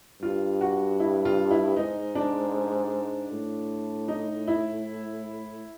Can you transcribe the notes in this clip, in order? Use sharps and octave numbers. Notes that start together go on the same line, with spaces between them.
G2 F4
F#4
E4
F4
E4
G#2 D#4
D4
A2
D#4
E4